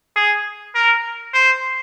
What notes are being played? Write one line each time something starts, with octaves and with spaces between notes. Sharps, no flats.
G#4
A#4
C5